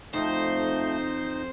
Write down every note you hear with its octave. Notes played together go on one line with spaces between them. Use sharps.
F2 F3 A3 D#4 C5